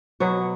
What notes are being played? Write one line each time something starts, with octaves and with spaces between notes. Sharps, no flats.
B2 F#3 F#4